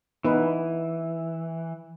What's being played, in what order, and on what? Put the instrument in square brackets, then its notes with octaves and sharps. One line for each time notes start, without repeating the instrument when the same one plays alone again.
[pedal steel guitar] E3 [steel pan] B3 D#4 B4